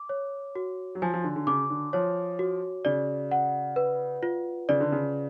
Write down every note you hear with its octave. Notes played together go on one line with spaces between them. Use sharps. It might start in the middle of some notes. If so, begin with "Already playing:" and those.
Already playing: D6
C#5
F#4
F#3
F3 G#5
F3
D3
D3
C#3 D6
D3
F3 C#5
F#4
C#3 D5
F#5
B4
F4
C#3 D5
D3
C#3